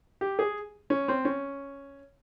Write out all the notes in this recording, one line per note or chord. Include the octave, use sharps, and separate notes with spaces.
G4
G#4
C#4
C4
C#4